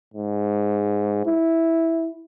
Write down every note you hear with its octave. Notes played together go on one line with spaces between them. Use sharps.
G#2
E4